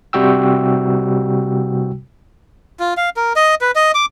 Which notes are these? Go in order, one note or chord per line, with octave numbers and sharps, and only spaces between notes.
C3 G3 F#4 G5 E6
F4
F5
A#4
D#5
B4
D#5
D6